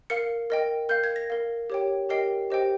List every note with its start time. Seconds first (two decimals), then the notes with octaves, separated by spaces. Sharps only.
0.10 A#4 F5 C#7
0.50 A#4 D#5 G5
0.89 A#4 F5 G6
1.04 G#6
1.16 A#6
1.30 A#4 F5
1.70 G4 C#5 G5
2.09 G4 A#4 D#5 G5 C7
2.50 G4 C5 D#5 G5